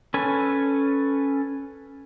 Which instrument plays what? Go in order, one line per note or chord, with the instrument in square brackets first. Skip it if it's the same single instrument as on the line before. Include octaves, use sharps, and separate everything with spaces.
[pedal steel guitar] C#4 A4 B4 G#5